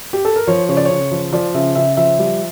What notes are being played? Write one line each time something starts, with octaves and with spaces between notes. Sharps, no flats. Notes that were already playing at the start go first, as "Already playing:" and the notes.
G4
A4
A#4
F3 C#5
C#3 C#5
D5
C#3 C#5
F3
F3 D5
C#3 E5
C#3 E5
F3 E5
G3